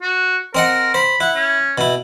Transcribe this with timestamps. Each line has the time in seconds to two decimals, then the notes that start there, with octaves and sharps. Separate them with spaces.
0.02 F#4
0.55 C4 A#4 D#5 F#5
0.94 C5 B5
1.20 E4 F#5
1.36 C#4
1.78 B2 E4